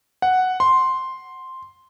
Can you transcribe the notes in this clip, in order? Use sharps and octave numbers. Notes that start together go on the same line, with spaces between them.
F#5
C6